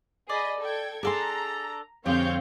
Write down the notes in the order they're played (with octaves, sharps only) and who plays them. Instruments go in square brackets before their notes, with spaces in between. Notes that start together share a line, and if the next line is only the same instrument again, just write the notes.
[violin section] G#4 D#5 B5 [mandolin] D5
[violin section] A4 G5 G#6
[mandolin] D4 A4 C6 [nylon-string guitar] G#4 F#5 G#5 [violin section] A#5
[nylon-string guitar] F2 D3 [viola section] C4 [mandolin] G4 G#4 [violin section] C#5 F5 G6